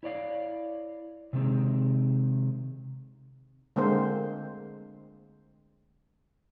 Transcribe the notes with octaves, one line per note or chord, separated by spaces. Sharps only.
E4 C#5 D5 F5
C3 D#3 G#3 C4
D3 G#3 A#3 C4 C5